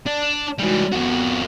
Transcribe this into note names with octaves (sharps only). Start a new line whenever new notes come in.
D4 A5
E3 G3 G#3 D#4 F#4
F2 B3 F#4